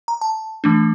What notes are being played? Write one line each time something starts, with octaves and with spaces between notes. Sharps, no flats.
A#5
A5
E3 A3 D4